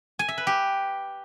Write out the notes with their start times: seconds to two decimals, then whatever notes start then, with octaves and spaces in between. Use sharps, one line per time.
0.19 G#5
0.28 E5
0.38 B4
0.47 G4